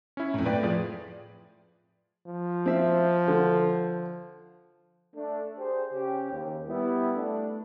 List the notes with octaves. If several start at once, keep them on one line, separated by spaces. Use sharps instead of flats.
C#4 E4
F2 A2
A2 B4 D5 G5
F3 G#4 D5
F3
C4 E5
D3
A3 D4
G4 G#4 C5
C#3 C#4 G4
D#2
G3 B3 E4
A3 D4